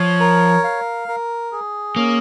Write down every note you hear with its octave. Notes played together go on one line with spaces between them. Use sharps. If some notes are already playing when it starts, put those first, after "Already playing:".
Already playing: F3 C#5
A#4
F5
A#4
G#4
A#3 C#4